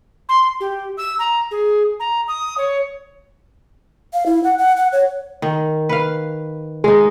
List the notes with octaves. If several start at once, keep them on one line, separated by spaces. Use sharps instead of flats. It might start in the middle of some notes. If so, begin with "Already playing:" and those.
C6
G4
E6
A#5
G#4
A#5
D#6
C#5
F5
E4
F#5
F#5
F#5
C#5
D#3
B4 F5
G#3 D#4 G#4